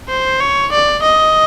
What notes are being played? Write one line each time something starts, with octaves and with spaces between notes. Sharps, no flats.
C5
C#5
D5
D#5